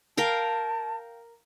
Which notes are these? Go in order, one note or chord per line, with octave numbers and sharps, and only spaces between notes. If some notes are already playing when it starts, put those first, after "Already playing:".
A#4 F5 G5 A5